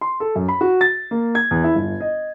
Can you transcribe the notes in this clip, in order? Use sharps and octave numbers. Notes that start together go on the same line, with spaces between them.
C6
A4
F#2
B5
F#4
A6
A#3
G#6
E2
E4
G1
D#5